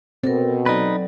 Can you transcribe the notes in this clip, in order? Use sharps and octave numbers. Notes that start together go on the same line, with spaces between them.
B2 C4 A4 A#4
F#3 D#4 A4 B4 D5